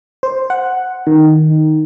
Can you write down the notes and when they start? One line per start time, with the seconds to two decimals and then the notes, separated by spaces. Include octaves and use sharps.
0.23 C5
0.50 F#5
1.07 D#3